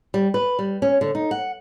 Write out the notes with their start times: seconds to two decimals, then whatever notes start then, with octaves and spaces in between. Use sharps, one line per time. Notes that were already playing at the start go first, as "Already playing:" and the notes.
0.14 G3
0.34 B4
0.59 G3
0.82 C#4
1.01 D3
1.15 D#4
1.31 F#5